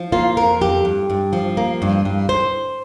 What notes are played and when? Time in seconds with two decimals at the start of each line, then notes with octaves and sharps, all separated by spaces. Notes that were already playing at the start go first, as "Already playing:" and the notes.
Already playing: F3
0.12 A#3 F4
0.37 F2 A#4
0.61 F2 G4
0.85 G2
1.10 G2
1.33 F3
1.57 A#3
1.82 G2
2.05 G2
2.29 C5